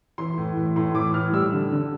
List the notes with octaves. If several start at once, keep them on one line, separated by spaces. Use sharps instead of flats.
E3 C6
A2
E3
A2 C6
E3 D6
A2 F6
G3 E6
D3
D3